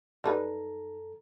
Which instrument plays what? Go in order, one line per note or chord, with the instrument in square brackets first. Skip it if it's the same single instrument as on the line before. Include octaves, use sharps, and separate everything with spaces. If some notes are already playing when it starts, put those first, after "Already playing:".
[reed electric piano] F#2 A4 A#5 [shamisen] G3 D#4 B4